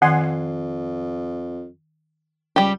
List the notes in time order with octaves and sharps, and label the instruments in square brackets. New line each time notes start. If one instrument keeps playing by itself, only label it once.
[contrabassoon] F2 [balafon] D#3 [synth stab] F#5 G#5 C6
[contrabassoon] C#2 [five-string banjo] G3 G4